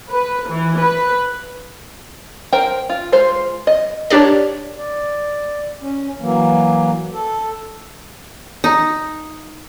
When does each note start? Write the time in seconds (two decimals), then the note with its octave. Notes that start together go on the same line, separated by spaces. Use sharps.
0.11 B4
0.51 E3
0.80 B4
2.52 A#4 C5 G5
2.89 F4
3.12 G#3 F4 C5
3.67 D#5
4.10 D4 G4 A#4 C#5 D5
4.76 D5
5.81 C#4
6.20 E3 F#3 A#3
7.13 A4
8.64 D#4